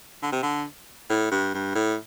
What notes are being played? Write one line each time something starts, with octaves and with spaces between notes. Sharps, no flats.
D3
C3
D3
A2
G2
G2
A2